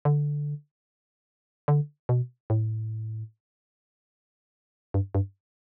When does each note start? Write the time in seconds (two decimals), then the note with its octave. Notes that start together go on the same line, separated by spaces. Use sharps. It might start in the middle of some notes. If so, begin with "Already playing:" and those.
0.05 D3
1.68 D3
2.09 B2
2.50 A2
4.94 G2
5.15 G2